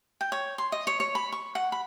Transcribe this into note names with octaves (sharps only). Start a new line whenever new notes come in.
G5
C#5
C6
D#5
C#5
C#5
B5
C#6
F#5
B5